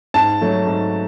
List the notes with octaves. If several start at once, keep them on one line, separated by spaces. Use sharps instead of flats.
G#2 A5
F#3 A3
G#2